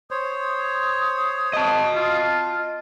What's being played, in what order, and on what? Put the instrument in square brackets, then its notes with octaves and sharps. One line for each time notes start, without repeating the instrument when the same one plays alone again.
[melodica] C5 C#5 [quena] D#6
[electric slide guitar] D#5 A5
[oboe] F4